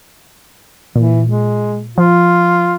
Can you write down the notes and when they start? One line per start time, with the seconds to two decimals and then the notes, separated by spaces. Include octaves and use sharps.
0.96 A#2 E3
1.28 G#3
1.98 F3 F4